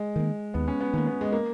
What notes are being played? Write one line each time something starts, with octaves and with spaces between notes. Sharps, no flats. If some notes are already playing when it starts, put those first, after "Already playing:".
Already playing: G#3
D#3 A#3
D#2 B3
C#4
B3
D#3 A#3 C#4
B3
G#3
A#3